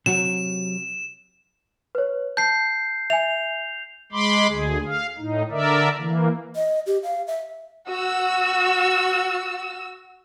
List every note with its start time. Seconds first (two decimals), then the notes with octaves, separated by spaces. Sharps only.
0.06 C3 F#3 F#4 E7
1.95 B4 C#5
2.37 A5 G6 C7
3.10 E5 G#5 F7
4.12 G#3 B5 C6 D6
4.48 D2 G#4
4.86 F5
5.18 A2 D#4
5.51 D3 A#4 D5 E5
5.98 E3 A#3
6.55 D#5
6.87 G4
7.03 F5
7.27 E5
7.89 F#4 E6